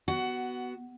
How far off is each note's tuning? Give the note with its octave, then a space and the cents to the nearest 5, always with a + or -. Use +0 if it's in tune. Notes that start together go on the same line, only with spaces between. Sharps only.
B3 +0 F#4 +15